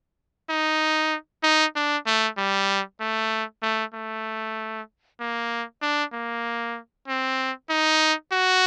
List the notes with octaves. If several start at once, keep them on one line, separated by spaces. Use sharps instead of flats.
D#4
D#4
D4
A3
G3
A3
A3
A3
A#3
D4
A#3
C4
D#4
F#4